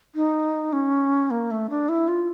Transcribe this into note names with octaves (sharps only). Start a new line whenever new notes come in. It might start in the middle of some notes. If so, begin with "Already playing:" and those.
D#4
C#4
A#3
A3
D4
E4
F4